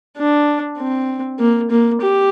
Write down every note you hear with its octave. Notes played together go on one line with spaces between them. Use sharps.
D4
C4
A#3
A#3
G4